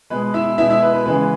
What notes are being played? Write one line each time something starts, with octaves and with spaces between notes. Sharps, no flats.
B2 G#3 B4
E4 E5
B2 G#3 E4 E5
E4 E5
B4
B4
C#3 E3 G#3 B4